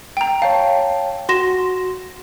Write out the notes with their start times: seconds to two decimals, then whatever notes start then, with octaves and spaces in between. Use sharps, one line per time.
0.17 G5 A#5
0.42 C#5 F5 G5 A5
1.29 F#4 C6 A#6 E7